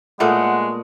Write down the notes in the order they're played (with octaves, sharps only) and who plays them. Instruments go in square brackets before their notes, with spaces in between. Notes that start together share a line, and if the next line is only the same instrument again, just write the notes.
[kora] A#2 A3 B3 [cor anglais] G#3 [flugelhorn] F#5